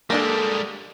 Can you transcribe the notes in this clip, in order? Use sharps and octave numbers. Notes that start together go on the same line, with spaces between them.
G3 G#3 A#3 D4 A4